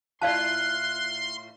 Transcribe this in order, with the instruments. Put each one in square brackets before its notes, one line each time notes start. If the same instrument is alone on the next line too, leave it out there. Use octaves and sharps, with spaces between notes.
[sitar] A2 E4 F4 [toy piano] D5 F5 A5 [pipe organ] C6 [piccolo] F#6